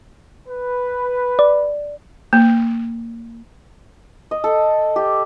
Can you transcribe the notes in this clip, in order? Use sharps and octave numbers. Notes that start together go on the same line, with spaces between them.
B4
D5
A#3
D#5
A4
G4